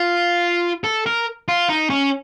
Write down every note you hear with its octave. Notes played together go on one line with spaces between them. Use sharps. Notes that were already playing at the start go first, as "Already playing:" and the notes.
Already playing: F4
A4
A#4
F4
D#4
C#4